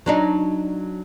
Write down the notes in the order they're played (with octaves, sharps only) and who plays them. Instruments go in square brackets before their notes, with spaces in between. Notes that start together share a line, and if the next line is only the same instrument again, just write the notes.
[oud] F#3 D4 D#4